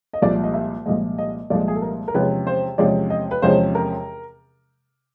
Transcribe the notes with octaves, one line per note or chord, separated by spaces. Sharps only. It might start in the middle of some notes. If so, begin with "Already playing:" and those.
D#5
C2 A#2 F3 G#3 D5
D#5
E5
C2 A#2 F3 G#3 D#5
D#5
C2 A#2 F3 G#3 D5
G#4
A4
A#4
A#4
E2 C3 F3 G#3 C#4 B4
C5
E2 C3 F3 G#3 C#4 D5
D#5
B4
E2 C3 F3 G#3 C#4 C5
A#4